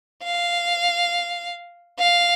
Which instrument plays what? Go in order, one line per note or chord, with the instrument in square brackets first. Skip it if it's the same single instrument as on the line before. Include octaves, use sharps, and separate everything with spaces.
[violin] F5
F5